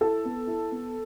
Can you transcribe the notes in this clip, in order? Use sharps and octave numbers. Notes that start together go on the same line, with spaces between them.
E4 A4
B3
E4
B3